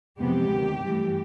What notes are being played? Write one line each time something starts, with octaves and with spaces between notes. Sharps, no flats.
F2 C3 E3 G#3 B3 G4
D2 C3 D#3
G2 E3 A3